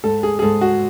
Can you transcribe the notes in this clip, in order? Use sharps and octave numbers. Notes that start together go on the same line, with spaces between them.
G#2 A4
G#4
G#4
G#2 A4
F#4